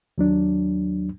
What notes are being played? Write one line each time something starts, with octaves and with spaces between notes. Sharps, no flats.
D#2 F#3 D4